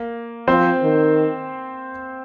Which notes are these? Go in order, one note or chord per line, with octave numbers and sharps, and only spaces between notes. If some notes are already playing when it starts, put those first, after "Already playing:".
Already playing: A#3
F3 C4 C5
D#3